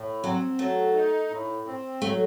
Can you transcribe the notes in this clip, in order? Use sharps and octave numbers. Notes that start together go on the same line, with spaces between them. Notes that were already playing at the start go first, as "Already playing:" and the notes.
Already playing: A2
F#3 C4
F#3 A3
D#4
A2
C4
F#3 A3